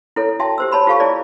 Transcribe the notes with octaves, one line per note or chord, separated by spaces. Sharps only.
E4 A4 C#5
F#4 E5 G5 A5 C6
G4 C5 E6
C#5 A5 B5 C6
F4 G4 A4 F5 A5 C#6
E4 G#4 C#5 D5